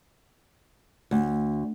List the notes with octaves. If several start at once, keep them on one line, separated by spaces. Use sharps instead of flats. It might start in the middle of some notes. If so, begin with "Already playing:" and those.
D2